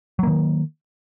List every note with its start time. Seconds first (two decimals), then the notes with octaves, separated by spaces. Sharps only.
0.19 F#3
0.23 A#3
0.27 D#3